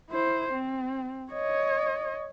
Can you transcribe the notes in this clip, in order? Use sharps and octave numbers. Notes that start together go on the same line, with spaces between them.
E4 C5
C4
C#5 D#5